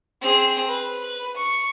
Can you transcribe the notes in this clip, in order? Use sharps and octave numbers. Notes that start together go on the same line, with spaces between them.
C4 G#4
B4
C#6